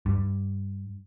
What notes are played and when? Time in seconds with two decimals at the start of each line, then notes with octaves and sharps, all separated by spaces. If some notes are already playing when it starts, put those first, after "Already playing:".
0.06 G2